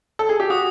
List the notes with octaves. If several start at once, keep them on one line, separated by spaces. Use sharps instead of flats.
A4
G#4
G4
F#4 D#6